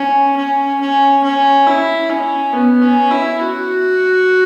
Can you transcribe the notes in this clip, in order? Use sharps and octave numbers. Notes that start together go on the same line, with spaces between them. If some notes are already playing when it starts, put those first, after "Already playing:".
Already playing: C#4
C#4
C#4
C#4
E4
C#4
B3
C#4
E4
F#4